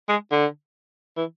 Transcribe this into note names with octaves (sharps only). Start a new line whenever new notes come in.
G#3
D3
E3